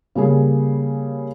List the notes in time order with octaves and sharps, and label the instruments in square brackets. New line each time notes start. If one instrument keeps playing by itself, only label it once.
[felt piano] C#3 G3 A#3 G#4